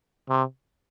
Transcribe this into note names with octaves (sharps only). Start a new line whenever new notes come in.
C3